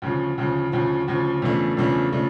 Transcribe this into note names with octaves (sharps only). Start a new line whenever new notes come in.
D2 C#3 F3
D2 C#3 F3
D2 C#3 F3
D2 C#3 F3
E2 C#3 F3 A3 D4
E2 C#3 F3 A3 D4
C#3 F3 A3 D4